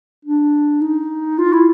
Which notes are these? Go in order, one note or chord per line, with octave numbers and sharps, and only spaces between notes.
D4
D#4
F4
E4